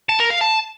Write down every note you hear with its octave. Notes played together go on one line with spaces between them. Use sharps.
A5
A#4
F5
A5